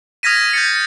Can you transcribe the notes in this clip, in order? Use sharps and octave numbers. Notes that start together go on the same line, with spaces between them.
D#6 F6 G#6 A#6 B6 D#7
G6 A6 C#7